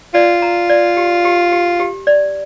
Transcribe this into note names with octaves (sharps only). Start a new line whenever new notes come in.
F4 D5
A#5
D5
G4
G4
G4
G4
D5